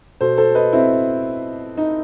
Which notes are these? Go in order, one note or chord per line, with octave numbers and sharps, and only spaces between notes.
B2 A4 C5
A4 C5
B4 D#5
C4 E4
D#4